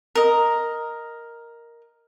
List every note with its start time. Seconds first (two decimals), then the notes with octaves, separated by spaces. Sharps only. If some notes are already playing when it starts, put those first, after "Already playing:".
0.15 A#4 D#5